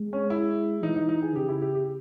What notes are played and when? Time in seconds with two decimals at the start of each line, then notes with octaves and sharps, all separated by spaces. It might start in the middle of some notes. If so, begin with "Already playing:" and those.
Already playing: G#3
0.13 C#4
0.30 E4
0.82 E3 D#4
0.96 D#4
1.09 D#4
1.22 G#4
1.35 C#3 G4
1.49 E4
1.62 G4
1.75 G4